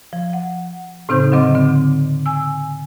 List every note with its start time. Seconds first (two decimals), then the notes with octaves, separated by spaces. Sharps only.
0.13 F3
0.33 F#5
1.09 A2 C#3 C4 D#4 C5 G6
1.32 D3 F#3 C4 D#5 D6
1.55 D3 C4
2.26 G#5 E6